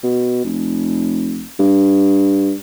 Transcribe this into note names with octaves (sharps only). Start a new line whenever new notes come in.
B2
F1
G2